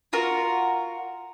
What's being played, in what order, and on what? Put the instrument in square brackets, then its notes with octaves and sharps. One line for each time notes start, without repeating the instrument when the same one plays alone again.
[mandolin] F4 F#4 A#4